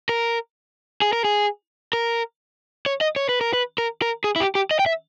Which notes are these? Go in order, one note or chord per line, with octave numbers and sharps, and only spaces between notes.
A#4
G#4
A#4
G#4
A#4
C#5
D#5
C#5
B4
A#4
B4
A#4
A#4
G#4
E4
G4
G4
D#5
G5
E5